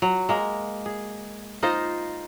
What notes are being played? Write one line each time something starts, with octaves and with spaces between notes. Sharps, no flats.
F#3
G#3 A#3
G#4
D#4 F4 C5 D#5